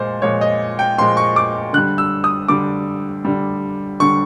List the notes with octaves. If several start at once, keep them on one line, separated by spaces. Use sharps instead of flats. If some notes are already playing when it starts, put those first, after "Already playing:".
Already playing: A#2 F3 G#3 C5
A#2 F3 G#3 C#5
D#5
G5
A#2 F3 G#3 C6
C#6
D6
D3 G3 F#6
E6
D#6
D3 G3 D6
D3 G3
D3 G3 C#6